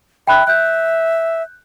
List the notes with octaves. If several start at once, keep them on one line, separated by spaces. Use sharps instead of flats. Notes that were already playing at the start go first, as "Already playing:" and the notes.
E5 G5 B5 F#6
E5 F#6 G6